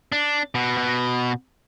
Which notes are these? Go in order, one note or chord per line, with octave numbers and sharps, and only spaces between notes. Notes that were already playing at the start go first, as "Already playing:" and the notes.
D4
B2
B2